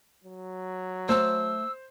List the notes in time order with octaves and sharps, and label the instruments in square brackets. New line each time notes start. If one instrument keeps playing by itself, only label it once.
[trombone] F#3
[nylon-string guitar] A3 A5 [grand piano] C5 [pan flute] E6